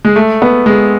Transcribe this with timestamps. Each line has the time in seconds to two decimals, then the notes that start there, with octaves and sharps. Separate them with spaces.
0.05 G#3
0.16 A3
0.42 B3
0.66 G#3